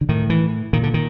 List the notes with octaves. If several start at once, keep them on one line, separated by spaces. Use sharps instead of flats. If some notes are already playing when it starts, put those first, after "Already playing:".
D3
A2 D#3
E3
A#2 D#3
D3
D#3